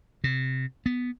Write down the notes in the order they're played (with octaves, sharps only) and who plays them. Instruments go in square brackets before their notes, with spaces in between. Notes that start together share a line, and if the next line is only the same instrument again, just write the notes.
[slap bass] C3
B3